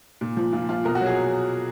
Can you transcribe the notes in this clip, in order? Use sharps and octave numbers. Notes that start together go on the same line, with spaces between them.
A#2
F3
A#2 F4
F3 F4
B2 A#4
F#4
F#3
G#4